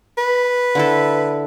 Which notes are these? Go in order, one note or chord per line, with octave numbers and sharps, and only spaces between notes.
B4
D3 E4 A4